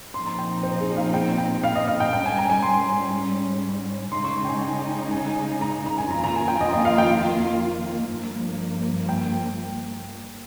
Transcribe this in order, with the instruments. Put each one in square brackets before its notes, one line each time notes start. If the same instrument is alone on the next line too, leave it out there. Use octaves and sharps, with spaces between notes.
[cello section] A#2 F3 C4 D#4 [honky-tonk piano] C6
[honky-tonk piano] A#5
G5
C5
G#4
F5
G5
G5
F5
D#5
F5
G5
[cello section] G#2 G3 C#4 [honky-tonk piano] G5
[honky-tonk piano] G#5
A#5
G#5
C6
[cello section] C#3 G#3 D#4 [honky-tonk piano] C6
[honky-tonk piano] C#6
C#6
G5
G#5
G5
G#5
A#5
A#5
G#5
[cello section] F2 D#3 A#3 F4 [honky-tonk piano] A#5
[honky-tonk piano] A#5
G#5
G5
D#5
D#5
F5
G5
F5
[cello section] G2 F3 A#3
[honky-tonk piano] G5